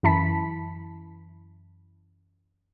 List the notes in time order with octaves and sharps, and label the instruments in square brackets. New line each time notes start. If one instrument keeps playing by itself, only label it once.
[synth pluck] F#2 E3 E4 A5 B5 B6